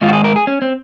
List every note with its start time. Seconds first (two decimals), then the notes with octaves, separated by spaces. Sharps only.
0.01 G#2 D#3 G#3 F4
0.09 F#4
0.13 G#4
0.24 A#4
0.36 G#4
0.47 C#4
0.62 C4